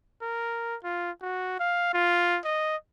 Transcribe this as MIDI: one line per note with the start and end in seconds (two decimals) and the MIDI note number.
0.22 0.76 70
0.84 1.11 65
1.22 1.59 66
1.59 1.90 77
1.93 2.39 65
2.44 2.76 75